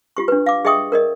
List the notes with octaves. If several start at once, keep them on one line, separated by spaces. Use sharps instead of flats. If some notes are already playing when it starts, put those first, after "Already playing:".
F4 G4 C#6
D4 B4
F5 D6
G#4 D#5 E5 G5 C#6 D#6
A#4 D5 D#5